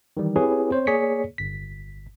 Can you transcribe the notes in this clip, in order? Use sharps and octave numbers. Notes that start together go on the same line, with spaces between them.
D#3 E3 G3
C4 E4 G4 G#4 B4 C#5
C4 C5 C#5
A#3 G#4 C#5 D5 B6 C#7
G1 B6